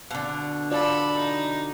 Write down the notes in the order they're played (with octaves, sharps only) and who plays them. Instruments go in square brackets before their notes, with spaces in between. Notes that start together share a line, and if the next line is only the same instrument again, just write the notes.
[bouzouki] B2 D3
[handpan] F4 D5 [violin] A4 B5
[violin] D#4